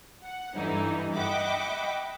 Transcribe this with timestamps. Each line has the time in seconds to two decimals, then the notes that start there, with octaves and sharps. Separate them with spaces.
0.24 F#5
0.56 G2 D3 E3 D#4 E4
1.14 D#5 E5 F#5 G5 B5 D6